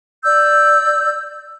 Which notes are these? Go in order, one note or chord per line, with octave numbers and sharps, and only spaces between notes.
D5 E6 G6